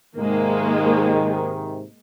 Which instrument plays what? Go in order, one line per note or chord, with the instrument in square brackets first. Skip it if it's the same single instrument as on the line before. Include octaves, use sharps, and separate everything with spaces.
[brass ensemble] G#2 C3 D#3 [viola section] G#3 A#3